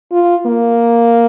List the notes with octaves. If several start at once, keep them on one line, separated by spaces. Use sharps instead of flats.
F4
A#3